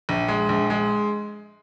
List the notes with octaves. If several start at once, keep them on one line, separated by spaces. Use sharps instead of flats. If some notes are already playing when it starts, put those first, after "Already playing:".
A#1
G#3
A#1
G#3